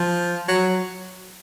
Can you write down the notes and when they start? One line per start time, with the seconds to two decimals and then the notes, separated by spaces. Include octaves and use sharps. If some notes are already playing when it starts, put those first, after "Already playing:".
Already playing: F3
0.49 F#3